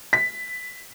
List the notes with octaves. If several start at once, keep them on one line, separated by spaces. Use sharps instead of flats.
B6